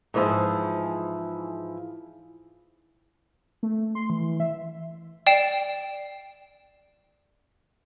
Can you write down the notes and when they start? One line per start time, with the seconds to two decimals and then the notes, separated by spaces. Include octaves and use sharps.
0.14 G#2 E3 F3 E4 G#4 F5
3.63 A3
3.95 C6
4.10 E3
4.40 E5
5.27 D5 G5 C7 E7